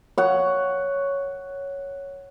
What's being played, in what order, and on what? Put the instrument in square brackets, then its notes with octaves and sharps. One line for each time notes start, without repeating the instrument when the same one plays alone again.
[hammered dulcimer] C#5 F#5